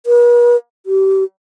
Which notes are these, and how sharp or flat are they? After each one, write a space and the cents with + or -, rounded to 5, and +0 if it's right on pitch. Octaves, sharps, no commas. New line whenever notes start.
B4 -45
G4 -30